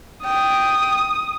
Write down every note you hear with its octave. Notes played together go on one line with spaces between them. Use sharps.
G5 D#6